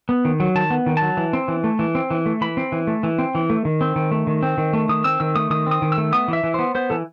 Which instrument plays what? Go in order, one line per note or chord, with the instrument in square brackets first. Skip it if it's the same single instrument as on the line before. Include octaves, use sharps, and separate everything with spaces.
[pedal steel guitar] B3
D#3
F#3
D#3 A5
B3
D#3
F#3 A5
E3
C4
E3
A3
E3
C4
E3
A3
E3 B5
C4
E3
A3
E3
C4
E3
A3
D#3
C4
D#3
A3
D#3
C4
D#3
A3
D#3 D#6
C4 E6
D#3 E6
A3 D#6
D#3 D#6
C4 D#6
D#3
E6
A3
B3 D#6
E3 E5
E3
B3 C5
B3 C5
E3 A4